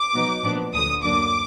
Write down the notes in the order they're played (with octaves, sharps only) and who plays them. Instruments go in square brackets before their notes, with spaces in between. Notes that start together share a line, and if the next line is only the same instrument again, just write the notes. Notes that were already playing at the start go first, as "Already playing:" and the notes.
Already playing: [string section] D6
B2 F#3 B3 D#4
A#2 F3 B3 D4
D2 D3 F#3 D#6
F#2 D3 F#3 A#3 D4 D6